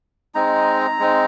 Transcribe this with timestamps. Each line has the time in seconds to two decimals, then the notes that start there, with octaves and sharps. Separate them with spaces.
0.35 G#3 C4 D#4 A#5
0.99 G#3 C4 D#4